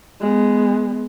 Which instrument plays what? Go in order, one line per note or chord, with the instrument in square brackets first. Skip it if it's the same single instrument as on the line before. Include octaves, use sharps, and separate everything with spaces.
[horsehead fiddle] G#3 B3